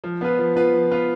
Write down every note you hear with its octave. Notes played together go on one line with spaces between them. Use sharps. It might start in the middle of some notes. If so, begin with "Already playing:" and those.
F3
B3 F4 B4
F3
B3 F4 B4
F3
B3 F4 B4